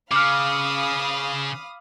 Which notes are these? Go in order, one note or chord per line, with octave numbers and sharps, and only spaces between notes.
C#3 F5 B5 D6 D#6 F6